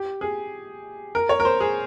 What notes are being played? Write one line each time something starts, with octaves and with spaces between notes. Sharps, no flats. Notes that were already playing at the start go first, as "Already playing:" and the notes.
Already playing: G4
G#4
A#4
C#5
A#4
C5
G#4